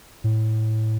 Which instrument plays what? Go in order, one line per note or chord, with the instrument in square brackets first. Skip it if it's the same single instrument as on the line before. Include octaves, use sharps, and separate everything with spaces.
[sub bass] A2